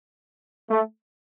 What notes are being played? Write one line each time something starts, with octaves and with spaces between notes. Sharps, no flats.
A3